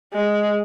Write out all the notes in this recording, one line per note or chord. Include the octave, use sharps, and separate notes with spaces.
G#3